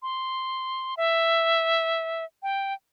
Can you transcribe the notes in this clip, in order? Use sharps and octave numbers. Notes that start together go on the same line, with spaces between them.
C6
E5
G5